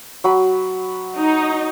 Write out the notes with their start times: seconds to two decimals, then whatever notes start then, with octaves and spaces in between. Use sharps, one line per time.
0.24 F#3 B5
1.18 D#4